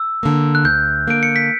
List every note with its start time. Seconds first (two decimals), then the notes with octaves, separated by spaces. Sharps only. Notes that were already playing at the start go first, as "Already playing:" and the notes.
Already playing: E6
0.23 D3 A#3
0.55 F#6
0.64 D2 G6
1.07 D3 A#3 D7
1.23 C#7
1.36 B6